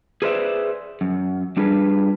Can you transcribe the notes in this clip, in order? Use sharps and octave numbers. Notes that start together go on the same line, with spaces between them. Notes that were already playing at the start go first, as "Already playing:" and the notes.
G#4 B4 C5 D5 E5
F#2
G3 D4 F4 G#4 B4